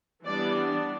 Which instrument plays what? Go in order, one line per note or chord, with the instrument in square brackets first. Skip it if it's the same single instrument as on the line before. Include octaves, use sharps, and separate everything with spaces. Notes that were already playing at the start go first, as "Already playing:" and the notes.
[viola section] E3 G3 B3 D4 D5